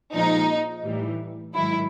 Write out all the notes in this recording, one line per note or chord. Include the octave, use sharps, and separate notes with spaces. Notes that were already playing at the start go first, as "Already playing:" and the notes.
A#2 F3 G#3 D#4
A2 E3 G3
G#2 D#3 F#3 E4